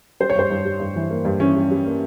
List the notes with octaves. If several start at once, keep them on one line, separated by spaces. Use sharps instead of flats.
G3 C5
C#5
G2 C5
G2
G3
G2
E3
A#3
G2
E3 C#4
G3
G3
A#3